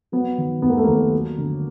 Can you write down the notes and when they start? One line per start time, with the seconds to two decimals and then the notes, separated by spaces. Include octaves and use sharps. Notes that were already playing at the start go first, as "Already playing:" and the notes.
0.12 F#3 B3
0.38 D#3
0.62 D#2 B3
0.69 A#3
0.78 A3
0.84 D#2 A#3
1.13 F#3
1.38 D3